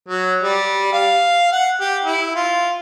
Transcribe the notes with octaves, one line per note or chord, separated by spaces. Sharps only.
F#3
G3
F5
F#5
G4
E4
F4